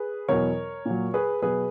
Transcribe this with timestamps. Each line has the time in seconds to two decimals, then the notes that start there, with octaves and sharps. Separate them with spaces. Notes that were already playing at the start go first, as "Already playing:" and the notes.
Already playing: G#4 B4
0.28 E2 B2 F#3 A#4 C#5
0.85 A#2 F#3
1.14 G#4 B4
1.42 B2 F#3 G#4 B4